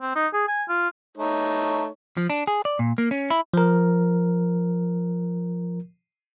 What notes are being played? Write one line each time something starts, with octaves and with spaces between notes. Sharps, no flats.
C4
D#4
G#4
G#5
F4
A3 D#4 C#5
F3
D4
G#4
D5
A#2
A#3
C#4
E4
F3 A#4